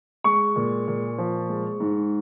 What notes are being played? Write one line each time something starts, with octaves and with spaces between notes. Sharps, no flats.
G#3 C#6
A#2
A#2
F3
G#3
G#2